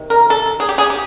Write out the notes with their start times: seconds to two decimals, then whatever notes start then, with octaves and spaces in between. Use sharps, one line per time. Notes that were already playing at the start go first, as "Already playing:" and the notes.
Already playing: C3 D#3
0.10 A#4
0.30 A4
0.60 G#4
0.69 G4
0.78 G#4
0.90 G4